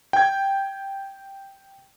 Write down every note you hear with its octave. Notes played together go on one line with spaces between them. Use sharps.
G5 G#6